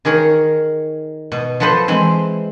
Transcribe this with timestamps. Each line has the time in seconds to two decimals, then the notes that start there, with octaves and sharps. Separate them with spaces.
0.05 D#3 G#4 A#4 C#5
1.32 B2
1.60 F3 F#3 A4 B4 C5
1.88 E3 G#3 C4